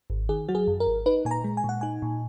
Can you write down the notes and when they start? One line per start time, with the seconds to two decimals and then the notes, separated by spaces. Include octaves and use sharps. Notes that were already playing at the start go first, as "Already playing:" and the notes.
0.10 G#1
0.29 D#3 G#4
0.49 F#3 F#4
0.55 G#4
0.67 F#2
0.80 A#4
0.87 G#1
1.06 D#4 B4
1.25 A#2 G#5
1.31 A#5
1.44 G#3
1.57 G#5
1.64 A#2 F#5
1.81 D#4 G#5
2.02 A#2